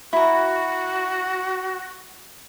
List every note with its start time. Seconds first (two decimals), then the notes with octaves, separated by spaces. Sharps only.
0.13 E4 F#4 A#5